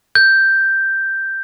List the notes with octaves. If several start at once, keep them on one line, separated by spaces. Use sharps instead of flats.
G6